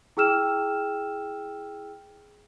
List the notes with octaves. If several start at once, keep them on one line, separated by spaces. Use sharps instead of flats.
E4 G#4 G5 E6 F6 E7